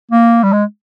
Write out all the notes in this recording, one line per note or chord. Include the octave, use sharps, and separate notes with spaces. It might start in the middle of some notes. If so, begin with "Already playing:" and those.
A#3
G3
G#3